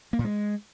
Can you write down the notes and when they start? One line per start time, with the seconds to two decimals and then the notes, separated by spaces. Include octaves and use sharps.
0.13 A#3
0.19 A#2
0.25 G#3